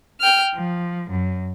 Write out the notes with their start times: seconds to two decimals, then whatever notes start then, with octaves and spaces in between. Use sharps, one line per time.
0.21 G5 F6
0.53 F3
1.10 F#2